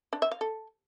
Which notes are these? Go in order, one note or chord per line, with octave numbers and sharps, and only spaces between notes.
D4
E5
F5
A4